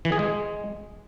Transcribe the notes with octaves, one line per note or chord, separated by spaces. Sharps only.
E3
G#4
G#3